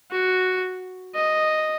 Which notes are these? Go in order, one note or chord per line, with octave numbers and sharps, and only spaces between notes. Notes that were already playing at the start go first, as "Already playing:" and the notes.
F#4
D#5